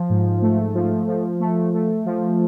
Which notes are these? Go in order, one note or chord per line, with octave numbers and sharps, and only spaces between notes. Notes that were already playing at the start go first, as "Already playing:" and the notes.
Already playing: F3
G#2
A3
F3
F3
A3
A3
F3